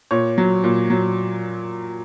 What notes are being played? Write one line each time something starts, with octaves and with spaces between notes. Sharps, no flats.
A#2 C#5
F#3
A#2
F#3